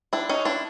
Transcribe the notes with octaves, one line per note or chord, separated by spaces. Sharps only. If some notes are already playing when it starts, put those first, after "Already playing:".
D4 E4
C#4 D#4
D4 E4